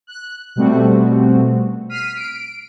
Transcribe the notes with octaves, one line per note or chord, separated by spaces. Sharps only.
F#6
B2 G3 A3 C4 F#4
F6 B6 C7 D#7
D7